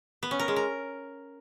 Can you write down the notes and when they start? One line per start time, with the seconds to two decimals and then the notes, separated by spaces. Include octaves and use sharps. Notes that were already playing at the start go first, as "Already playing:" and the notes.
0.23 B3
0.31 C#4
0.39 A#4
0.48 G#3
0.56 A#4